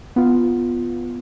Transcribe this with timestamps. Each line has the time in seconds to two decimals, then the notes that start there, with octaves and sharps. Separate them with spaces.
0.16 B3 F4